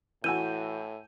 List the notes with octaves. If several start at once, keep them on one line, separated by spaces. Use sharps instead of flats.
A2 E3 F#4 G#5 E6 G6 D#7